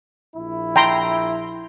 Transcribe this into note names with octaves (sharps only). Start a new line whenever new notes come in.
A#1 E4
G5 A#5 C6